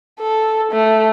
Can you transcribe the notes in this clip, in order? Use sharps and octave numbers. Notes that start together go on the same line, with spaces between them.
A4
A3